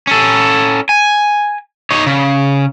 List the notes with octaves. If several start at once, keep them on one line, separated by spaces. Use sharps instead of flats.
C#4 A4
G#5
D#4 C#5
C#3